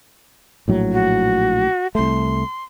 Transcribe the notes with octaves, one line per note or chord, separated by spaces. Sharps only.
A#1 A2 F#3
F#4
C2 A3 C6